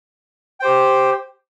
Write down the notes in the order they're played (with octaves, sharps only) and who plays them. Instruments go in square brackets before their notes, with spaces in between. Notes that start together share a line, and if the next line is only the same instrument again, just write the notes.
[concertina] G4 C5 G5